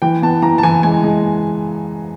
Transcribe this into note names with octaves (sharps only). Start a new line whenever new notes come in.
E3 G5
B3 A5
E3 A#5
A5
E3 G#5
G#3 G#5
G#3